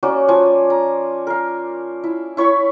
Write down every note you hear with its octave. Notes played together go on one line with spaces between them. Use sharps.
A#3 C#4 F#4 D5
F3 G#5
A#5
A#4 F5
E4
E4 C#5 B5 C#6